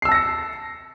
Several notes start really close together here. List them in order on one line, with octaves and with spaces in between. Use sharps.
C7 E6 A5 A#6 C#7